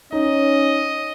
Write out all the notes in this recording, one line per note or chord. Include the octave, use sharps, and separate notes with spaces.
C#4 D#4 D#5